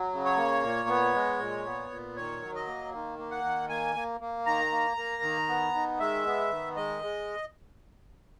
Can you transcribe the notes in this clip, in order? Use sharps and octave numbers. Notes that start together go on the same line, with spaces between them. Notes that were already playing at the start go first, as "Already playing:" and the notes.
Already playing: F#3
C#3
C#5
A#3
A#2
B3
G#3
A#2
B3
A#2
D#3 C#5
F#3
D#5
A#3
D#3
A#3
F#5
D#3
A#3 G#5
A#3
A#3
D#3 A#5
A#3
A#3
D#3
B3
D#3
G#3 E5
B3
D#3
G#3 D#5
G#3